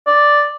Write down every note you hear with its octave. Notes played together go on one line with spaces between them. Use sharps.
D5